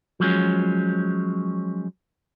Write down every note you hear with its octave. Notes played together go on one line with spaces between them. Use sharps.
F3 F#3 G#3 C#4